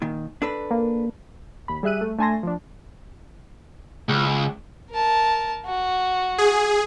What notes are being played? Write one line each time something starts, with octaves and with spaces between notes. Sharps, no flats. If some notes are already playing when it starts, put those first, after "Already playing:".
A#2 D#3
D4 A4 B4
A#3
D#2 B5
G3 G#4 E5 F#6 D#7
A3
A3 D4 G#5 A5 C6 A#6
F3 D4
C#2
A#4 A5
F#4
G#4